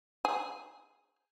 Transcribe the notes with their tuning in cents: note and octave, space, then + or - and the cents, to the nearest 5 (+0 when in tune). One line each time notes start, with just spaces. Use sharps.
G#4 +0 G#5 +0